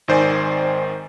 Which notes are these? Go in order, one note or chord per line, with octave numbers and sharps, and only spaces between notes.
G#1 D#3 C5 D5 G#5